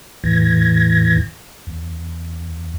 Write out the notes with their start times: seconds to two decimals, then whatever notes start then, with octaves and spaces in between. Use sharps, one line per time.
0.24 E2 A2 E3 G#6 A#6
1.67 E2